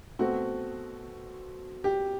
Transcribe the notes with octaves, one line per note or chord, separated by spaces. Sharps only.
B2 A3 C4 F#4
G4